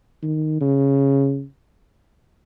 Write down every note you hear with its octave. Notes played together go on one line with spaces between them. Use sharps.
D#3
C#3